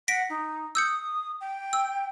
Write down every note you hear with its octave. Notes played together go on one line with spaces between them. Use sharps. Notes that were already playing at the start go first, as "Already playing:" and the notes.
F#5 A#6 B6 D7
D#4
D#6 E6 G6 C#7
G5
E6